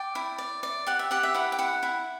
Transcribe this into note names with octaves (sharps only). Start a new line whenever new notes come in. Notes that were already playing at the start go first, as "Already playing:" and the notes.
Already playing: D5 G5
E4
D5
D5
G4 F#5
E5
G4 F#5
E5
E4 F#5
G5
E4 F#5
E4